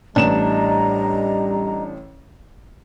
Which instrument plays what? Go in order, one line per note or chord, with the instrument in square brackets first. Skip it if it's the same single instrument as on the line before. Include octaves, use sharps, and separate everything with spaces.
[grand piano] A1 A2 E7 [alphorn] G3 [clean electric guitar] D4 [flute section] D#5 A#5